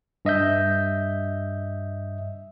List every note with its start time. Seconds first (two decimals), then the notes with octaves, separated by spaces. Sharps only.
0.25 G2 D#5 E5 G6